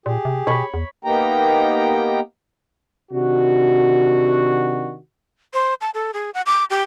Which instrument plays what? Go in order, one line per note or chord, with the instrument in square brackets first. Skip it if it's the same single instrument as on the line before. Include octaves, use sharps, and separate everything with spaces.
[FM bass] A#2 [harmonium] G4 G#4
[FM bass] C3
[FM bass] B2 [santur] C#5 B5
[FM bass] E2
[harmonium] A#3 B3 D#4 G4 G5 A#5
[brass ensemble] C3 D#3 D4 F#4
[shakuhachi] C5
A5
A4
G#4
F#5
D6
G4